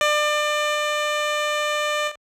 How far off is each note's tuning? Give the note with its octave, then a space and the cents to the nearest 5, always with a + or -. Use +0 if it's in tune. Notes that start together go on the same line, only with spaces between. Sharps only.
D5 +30